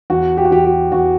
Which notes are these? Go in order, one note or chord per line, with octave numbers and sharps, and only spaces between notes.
E2 F#4
G4
F#4
E2 G4
G4
E2 F#4